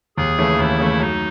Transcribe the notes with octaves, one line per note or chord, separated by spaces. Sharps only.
D#2 G#4
C#3 E3 A3
D#2 E4
C#3 E3 A3
F#2 D#4